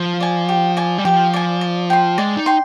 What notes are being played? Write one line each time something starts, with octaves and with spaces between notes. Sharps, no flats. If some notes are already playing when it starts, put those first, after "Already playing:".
Already playing: F3
D5 G#5
G4
D5 G#5
G3
F3 G4
D5 G#5
D5
G5 C6
G#3 D5
D#4
G5 C6